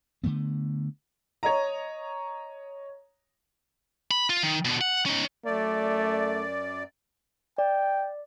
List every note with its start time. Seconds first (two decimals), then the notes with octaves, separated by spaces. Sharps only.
0.24 D3 D#3 A3 B3
1.43 C#5 D#5 A#5
4.11 B5
4.30 F4
4.43 D#3
4.65 B2 D3
4.81 F#5
5.06 C#4 D#4
5.46 F#2 A3 D5
7.58 D5 G5